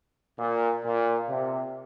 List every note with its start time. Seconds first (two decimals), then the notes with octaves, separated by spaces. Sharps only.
0.38 A#2
0.84 A#2
1.29 C3